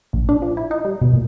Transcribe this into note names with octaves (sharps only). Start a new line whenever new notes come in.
A#1
D4
F3
E4
D#4
G3
B2
A#2